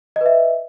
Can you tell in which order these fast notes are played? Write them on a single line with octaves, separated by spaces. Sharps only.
D#5 B4 E5